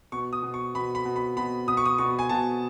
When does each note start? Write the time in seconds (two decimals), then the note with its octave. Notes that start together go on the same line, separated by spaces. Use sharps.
0.12 B2 C#6
0.33 D#6
0.43 B2
0.54 C#6
0.75 B2 B5
0.95 B5
1.05 B2
1.16 B5
1.37 B2 B5
1.67 B2 D#6
1.77 C#6
1.86 D#6
1.98 B2 C#6
2.19 G#5
2.29 B2 A5